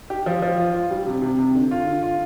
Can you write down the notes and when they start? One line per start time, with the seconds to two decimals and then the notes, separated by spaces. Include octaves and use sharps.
0.10 G4
0.26 F3
0.42 F3
0.58 F4
0.74 F4
0.91 G3
1.07 C3
1.22 C3
1.39 C3
1.55 D3
1.71 F4
1.86 D3
2.03 F4